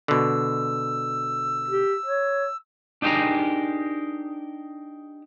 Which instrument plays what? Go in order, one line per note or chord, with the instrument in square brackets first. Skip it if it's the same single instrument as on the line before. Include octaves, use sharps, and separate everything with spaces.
[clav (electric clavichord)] B2 D3 [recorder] E6
[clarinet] G4
C#5
[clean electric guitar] D4 D#4 G4 G#4 A#4 A#5